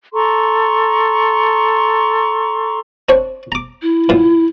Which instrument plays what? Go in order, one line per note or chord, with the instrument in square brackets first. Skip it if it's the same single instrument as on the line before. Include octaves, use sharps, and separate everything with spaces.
[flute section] A4 A#5 C6 C#6
[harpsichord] C4 D4 C#5
A#5 D6
[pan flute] E4
[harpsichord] F#2 A#2